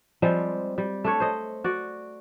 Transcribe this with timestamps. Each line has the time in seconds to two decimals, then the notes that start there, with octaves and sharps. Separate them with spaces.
0.22 F3 G3 G#3 C4
0.78 G3
1.04 A3 D4 C#5
1.20 C5 D#5
1.64 F#4 D5